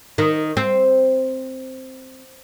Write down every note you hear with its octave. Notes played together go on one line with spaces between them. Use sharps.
D#3
C4